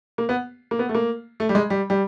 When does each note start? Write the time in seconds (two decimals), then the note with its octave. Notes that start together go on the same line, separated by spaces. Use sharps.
0.18 A#3
0.29 B3
0.71 A#3
0.79 B3
0.89 A3
0.95 A#3
1.40 A3
1.49 G3
1.55 G#3
1.70 G3
1.90 G3